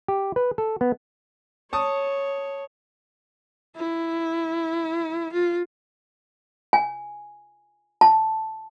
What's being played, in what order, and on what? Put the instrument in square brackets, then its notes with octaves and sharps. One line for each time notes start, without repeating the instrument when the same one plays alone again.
[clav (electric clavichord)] G4
B4
A4
B3
[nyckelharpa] C#5 [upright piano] A5 C#6 D#6
[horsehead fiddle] E4
F4
[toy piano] G#5
A5